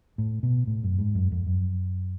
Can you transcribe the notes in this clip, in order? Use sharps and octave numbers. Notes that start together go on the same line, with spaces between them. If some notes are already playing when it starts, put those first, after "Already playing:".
A2
B2
A2
F#2
G#2
F#2
F2
F#2